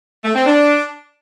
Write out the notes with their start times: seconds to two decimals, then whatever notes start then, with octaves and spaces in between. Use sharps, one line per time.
0.24 A3
0.35 C4
0.46 D4